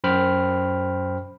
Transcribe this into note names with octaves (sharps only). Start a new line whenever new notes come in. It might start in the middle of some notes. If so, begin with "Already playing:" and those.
F#2 C5 G5 B5 F6